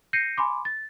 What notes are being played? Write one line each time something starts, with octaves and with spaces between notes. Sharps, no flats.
G6 A#6 C7 C#7 D#7
G#5 B5 C6 D6
A6